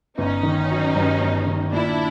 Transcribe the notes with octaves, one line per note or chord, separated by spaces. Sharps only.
G1 C#4 D#4
D#3
F#3
G2
G1
D#3
A#2 D4 E4